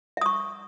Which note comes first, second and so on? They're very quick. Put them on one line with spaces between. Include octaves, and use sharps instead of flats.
E5 D#6 C#6